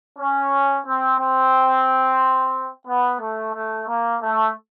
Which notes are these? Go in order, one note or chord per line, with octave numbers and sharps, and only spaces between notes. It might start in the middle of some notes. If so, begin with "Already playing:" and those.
C#4
C4
C4
B3
A3
A3
A#3
A3